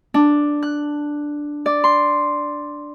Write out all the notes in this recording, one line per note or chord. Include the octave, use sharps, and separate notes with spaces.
D4
F#6
D5
C6